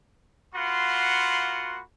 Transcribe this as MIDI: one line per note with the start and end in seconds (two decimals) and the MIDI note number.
0.54 1.81 58
0.54 1.81 65
0.54 1.81 66
0.54 1.81 78
0.54 1.81 83
0.54 1.81 84